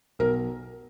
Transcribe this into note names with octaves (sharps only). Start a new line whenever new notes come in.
B1 A#4